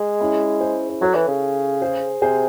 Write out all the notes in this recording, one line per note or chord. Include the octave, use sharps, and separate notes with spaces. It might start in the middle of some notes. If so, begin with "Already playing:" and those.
Already playing: G#3
C#4 E4
G#4 C5
C5
F#3 A4 C#5
E3
C#3
G#4 C5
C3 G#4 C5